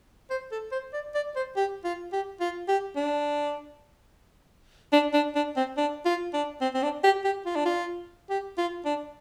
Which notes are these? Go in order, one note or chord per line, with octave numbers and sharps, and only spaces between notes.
C5
A4
C5
D5
D5
C5
G4
F4
G4
F4
G4
D4
D4
D4
D4
C4
D4
F4
D4
C4
C4
D4
G4
G4
F4
D4
F4
G4
F4
D4